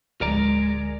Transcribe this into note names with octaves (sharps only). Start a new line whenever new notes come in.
D1 G#3 A#4 D5 A#5